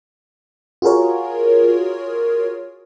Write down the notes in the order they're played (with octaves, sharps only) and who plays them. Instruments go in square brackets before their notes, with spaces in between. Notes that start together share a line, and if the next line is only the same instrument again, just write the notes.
[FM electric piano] F4 F#4 G#4 A#4 C#5